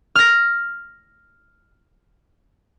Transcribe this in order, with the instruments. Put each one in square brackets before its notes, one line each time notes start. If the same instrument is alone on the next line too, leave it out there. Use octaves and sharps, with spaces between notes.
[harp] F6 A#6